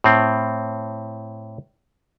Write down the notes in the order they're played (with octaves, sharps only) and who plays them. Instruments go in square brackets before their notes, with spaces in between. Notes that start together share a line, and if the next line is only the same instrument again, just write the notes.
[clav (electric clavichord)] A2 C4